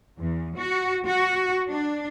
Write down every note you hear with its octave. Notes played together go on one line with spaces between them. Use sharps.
E2
F#4
F#4
D4